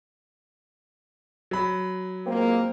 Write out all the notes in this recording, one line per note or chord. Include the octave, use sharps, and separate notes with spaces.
F#3 B5
A#2 G#3 A#3 C4